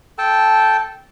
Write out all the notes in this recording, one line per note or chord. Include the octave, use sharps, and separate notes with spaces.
A4 G5 A5